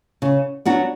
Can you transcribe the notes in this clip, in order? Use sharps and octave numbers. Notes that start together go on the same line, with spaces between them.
C#3
F#3 B3 D4 F#4